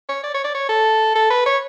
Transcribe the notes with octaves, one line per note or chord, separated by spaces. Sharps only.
C#5
D5
C#5
D5
C#5
A4
A4
B4
C#5